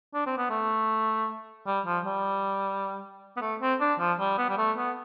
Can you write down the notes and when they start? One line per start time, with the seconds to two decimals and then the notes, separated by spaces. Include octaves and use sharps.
0.14 D4
0.26 C4
0.38 B3
0.50 A3
1.67 G3
1.86 F3
2.05 G3
3.37 B3
3.41 A3
3.61 C4
3.81 D4
3.99 F3
4.19 G3
4.38 B3
4.49 G3
4.58 A3
4.77 B3